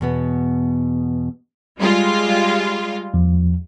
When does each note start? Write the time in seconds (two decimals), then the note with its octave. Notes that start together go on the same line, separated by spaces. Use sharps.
0.01 E2 B2 B3
1.77 G3 G#3 F4
3.14 E2 F3